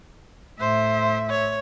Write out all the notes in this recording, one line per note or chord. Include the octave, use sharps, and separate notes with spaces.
A2 C5 E5
C#5